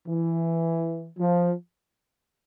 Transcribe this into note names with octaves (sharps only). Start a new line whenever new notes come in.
E3
F3